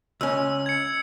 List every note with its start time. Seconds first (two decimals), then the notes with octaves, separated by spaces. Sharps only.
0.21 C#2 C#4 E6
0.66 G#6 C#7